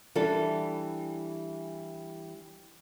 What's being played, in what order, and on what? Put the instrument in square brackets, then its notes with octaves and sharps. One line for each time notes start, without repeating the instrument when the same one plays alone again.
[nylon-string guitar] E3 G3 D4 E4 A4